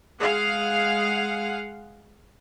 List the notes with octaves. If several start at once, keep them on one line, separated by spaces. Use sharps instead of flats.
G#3 G#4 F5 F#5